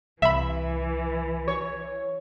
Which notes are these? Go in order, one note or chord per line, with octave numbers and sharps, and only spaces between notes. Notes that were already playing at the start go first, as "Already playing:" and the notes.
C2 E3 E5 B5
C#5